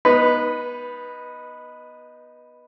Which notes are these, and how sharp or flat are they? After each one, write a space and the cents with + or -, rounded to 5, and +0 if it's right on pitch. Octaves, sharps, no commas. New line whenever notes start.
B3 -20 D#4 +0 B4 +0